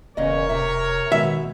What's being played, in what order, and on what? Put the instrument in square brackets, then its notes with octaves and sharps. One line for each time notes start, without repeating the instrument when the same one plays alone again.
[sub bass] E1 [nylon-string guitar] E2 C#3 D#5 [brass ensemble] A#4 C#5
[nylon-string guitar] C3 E5
[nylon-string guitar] B2 G#3 [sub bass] D#3 [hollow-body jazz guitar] E5